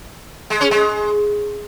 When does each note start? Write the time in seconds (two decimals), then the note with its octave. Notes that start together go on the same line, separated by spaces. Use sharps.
0.50 G#3
0.61 C#4
0.71 G#3